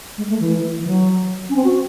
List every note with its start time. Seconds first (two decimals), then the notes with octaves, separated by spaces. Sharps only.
0.18 G#3
0.29 A3
0.40 E3
0.78 E3
0.87 F#3
1.49 C#4
1.56 C4
1.65 F#4